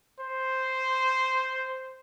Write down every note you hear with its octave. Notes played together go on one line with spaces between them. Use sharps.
C5